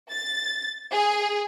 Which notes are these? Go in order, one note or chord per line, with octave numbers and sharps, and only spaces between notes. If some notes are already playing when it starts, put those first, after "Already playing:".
A6
G#4